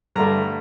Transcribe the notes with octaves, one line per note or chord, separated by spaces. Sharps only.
G2 D3 A3 A#5